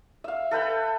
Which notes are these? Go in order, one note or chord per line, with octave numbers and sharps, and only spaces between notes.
E5 F5
A4 B4 G5 B5